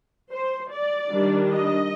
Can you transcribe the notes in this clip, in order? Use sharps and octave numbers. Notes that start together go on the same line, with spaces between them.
C5
D5
D#3 G3 D4
D#5